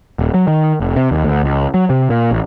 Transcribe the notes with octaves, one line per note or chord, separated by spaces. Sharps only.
D#1
F#3
D#3
F1
C3
D#2
D2
C#2
F#3
C3
A#2
A1